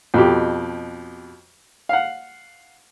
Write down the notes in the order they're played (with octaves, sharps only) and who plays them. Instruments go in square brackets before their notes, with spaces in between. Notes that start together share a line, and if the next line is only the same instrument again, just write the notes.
[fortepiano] F2 B2 G4
F5 F#5